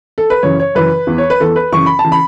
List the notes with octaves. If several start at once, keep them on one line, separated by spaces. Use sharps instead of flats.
A4
B4
F#2 C#3 E3 C#5
C#5
F#2 C#3 E3 B4
E2 E3
C#5
B4
E2 E3 A4
B4
F#2 C#3 E3 C#6
B5
A5
C#3 E3
B5